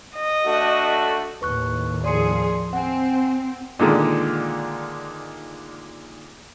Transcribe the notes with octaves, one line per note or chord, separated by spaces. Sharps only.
D#5
A3 D4 F#4
D#2 A2 B4 C#6 F#6
F3 G#4 D5 C6 C#7
C4 F#5 G#5
A#2 D3 D#3 G#3